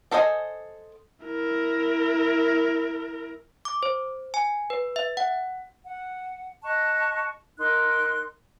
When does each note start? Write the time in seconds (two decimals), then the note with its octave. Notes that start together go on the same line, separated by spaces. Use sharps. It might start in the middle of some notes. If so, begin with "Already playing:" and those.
0.11 D4 A4 C5 D#5 G#5
1.26 E4 A#4
3.65 D6
3.83 C5
4.34 G#5
4.70 B4
4.96 E5
5.17 F#5
5.85 F#5
6.63 D#5 A5 C#6 F#6
7.58 D#4 A#4 C6 F#6